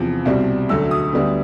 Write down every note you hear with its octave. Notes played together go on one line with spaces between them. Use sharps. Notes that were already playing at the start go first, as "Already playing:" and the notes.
Already playing: E2 C3 F3
C2 B2 G3 C4
D2 D3 F#3 A3 E6
D#6
D2 D3 G3 B3